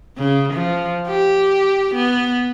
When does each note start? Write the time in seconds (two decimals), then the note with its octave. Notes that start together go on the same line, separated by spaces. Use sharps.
0.18 C#3
0.53 F3
1.07 G4
1.95 B3